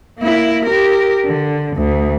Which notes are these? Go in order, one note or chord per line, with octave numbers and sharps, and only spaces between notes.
A#3 E4
G4 A#4
D3
D2